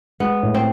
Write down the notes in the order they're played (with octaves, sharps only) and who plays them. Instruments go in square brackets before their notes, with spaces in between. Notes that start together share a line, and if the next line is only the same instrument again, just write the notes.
[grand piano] G#3 [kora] B3
[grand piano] A2
[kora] C4